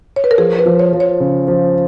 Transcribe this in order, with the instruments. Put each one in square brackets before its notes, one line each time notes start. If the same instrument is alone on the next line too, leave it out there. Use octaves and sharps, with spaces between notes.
[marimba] C#5
B4
A#4
[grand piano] F3 [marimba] G#4
[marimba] B4
[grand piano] F3
[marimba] C#5
[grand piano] F3
[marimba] C#5
[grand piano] C#3
F3